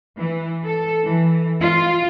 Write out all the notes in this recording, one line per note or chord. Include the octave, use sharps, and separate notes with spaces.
E3
A4
E3
F4